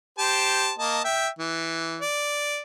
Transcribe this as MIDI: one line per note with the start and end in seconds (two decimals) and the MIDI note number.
0.19 0.72 67
0.19 0.72 72
0.19 0.72 81
0.79 1.01 58
0.79 1.01 75
0.79 1.01 81
1.04 1.28 76
1.04 1.28 79
1.39 1.99 52
2.01 2.61 74